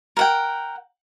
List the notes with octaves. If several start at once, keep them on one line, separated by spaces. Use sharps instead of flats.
A#4 F#5 G5